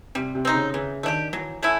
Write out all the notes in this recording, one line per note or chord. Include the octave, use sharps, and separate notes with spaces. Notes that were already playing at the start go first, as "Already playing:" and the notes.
C3 G3
C3
C4 D#4
C#3
C#3 E3
D#3 A3 D4 G4
E3 F#3
A3 C#4 E4